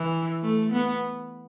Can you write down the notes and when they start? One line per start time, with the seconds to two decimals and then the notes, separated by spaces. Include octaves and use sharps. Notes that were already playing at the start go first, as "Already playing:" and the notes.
Already playing: E3
0.43 A3
0.72 B3